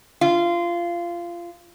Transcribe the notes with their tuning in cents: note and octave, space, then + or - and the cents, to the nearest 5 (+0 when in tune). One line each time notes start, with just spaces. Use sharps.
F4 -20 F5 -20